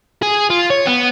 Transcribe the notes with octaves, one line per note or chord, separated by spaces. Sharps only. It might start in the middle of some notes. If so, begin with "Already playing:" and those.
G#4
F4
C#5
B3